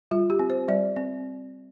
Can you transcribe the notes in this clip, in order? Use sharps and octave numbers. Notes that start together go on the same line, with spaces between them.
G3 F4
G4
C4
C5
G3 D5
C4